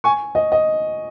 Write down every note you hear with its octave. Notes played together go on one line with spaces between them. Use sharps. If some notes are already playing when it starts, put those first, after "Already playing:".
G#5 C#6
D#5
D#5